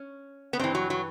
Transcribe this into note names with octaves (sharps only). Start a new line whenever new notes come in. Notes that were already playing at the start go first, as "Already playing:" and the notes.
Already playing: C#4
B3
G2 E3 C4
F#3
F#3